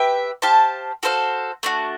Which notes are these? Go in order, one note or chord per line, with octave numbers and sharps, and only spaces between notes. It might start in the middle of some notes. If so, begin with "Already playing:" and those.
Already playing: G4 B4 E5 G5
G4 C5 F5 A5
F#4 A4 C5 F5
A3 D4 F#4